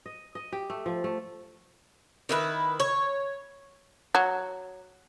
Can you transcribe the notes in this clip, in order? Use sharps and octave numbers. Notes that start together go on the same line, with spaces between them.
D#5
D#5
G4
A3
F3
A3
D#3 E4 B4
C#5
F#3